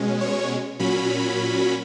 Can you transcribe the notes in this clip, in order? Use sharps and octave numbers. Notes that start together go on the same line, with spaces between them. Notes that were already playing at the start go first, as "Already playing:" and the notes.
Already playing: B2 G#3 C#4
C#5
A#2 F#3 C#4 B5